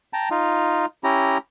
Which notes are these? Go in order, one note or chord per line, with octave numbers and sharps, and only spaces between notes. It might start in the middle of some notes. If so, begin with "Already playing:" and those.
G5 A5 A#5
D#4 F4
C#4 E4 G4 A#5